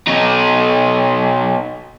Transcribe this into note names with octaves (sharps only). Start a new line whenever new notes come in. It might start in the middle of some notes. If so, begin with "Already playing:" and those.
B2 D#4